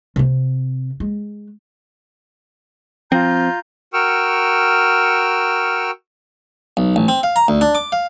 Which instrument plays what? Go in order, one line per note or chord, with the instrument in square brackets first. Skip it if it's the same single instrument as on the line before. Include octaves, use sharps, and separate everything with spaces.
[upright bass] C3 C4
G#3
[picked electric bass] F3 C4 [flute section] F4 A#5 G6
[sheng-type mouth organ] F#4 A#4 G5 C#6 E6 F6
[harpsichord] B1
A1
C4
F5
A#5
D2
D4
D6
F5